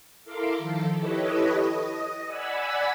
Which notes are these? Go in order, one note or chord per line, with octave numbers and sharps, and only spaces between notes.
E4 A4 A#4 F5 C6 D6
D#3 F3 A4
E4 G4 A4 B4 C#5 D#5
D#5
D5 F#5 G#5 B5 E6